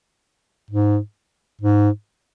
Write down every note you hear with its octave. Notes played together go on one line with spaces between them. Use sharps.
G#2
G#2